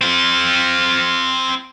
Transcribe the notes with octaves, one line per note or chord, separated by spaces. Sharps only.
C4 F4